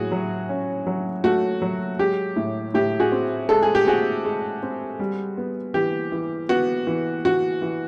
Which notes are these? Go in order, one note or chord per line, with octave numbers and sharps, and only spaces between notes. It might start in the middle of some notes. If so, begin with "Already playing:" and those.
Already playing: A2 F#3 F#4 G#4
F#3
C#4
F#3
A3 F#4
F#3
G#3 G4
A2
A2 G4
F#4 G#4
C4
G#3 A4
G#4
G4
C4 F#4 G#4
G#3
C4
G3
B3
E3 G4
E3
B3 F#4
E3
E3 F#4
E3